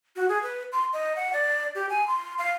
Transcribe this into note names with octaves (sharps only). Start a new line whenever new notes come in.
F#4
G#4
B4
C6
D#5
F#5
D5
G4
G#5
C6
F5